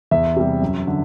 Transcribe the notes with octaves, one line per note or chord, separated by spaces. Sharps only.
E2 E5
C3 G3
F#2
D3